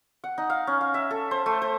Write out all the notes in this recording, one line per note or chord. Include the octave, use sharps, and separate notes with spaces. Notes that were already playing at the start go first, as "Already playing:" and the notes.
F#5
D#4
F5
C#4
F5
E5
A4
C5
A3
C5